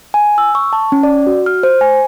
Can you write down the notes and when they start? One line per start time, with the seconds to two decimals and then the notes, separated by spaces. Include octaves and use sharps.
0.14 G#5
0.38 E6
0.55 C#6
0.73 A5
0.92 C#4
1.03 D5
1.27 F#4
1.46 F6
1.63 C5
1.81 G#5